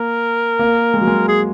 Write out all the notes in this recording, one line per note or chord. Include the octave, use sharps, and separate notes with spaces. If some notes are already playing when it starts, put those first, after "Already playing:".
Already playing: A#3 A#4
A#3
G#3
F#3
G#3
G#4